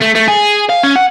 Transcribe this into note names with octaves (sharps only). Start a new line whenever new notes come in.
A3
A3
G#4
F5
C#4
F#5